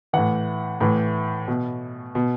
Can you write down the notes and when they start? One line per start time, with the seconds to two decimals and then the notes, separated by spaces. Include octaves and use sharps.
0.13 A2 E3 F#5
0.81 A2 E3
1.48 B2
2.15 B2